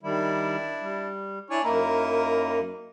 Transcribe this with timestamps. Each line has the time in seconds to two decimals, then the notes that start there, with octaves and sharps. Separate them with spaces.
0.03 D#3 G3 D4 E4
0.81 G3
1.50 D4 E4 C#5 G#5
1.64 F#2 A#3 D#4 E4 A#4